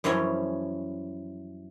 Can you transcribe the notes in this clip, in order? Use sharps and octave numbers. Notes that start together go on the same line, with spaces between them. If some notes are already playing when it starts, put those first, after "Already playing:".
F#2 E3 F3 G3 C#4 E4